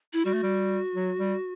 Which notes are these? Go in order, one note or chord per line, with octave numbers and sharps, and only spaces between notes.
E4
G3 F#4
A3
G3
F#3
G3